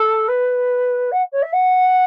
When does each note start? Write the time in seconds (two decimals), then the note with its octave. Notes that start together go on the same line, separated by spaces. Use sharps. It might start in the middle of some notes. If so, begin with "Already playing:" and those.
Already playing: A4
0.28 B4
1.12 F#5
1.33 C#5
1.42 E5
1.53 F#5